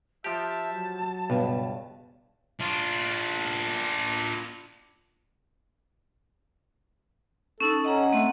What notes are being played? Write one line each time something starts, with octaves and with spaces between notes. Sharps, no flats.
F3 G4 E5 A5
F#3
C#2 G2 B2 B3
D4 F4
C#4 D#4 A4
C#4 D#5 F#5 A#5
A3 C4 F#5